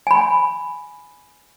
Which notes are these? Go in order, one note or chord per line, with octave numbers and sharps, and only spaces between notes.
G#5 B5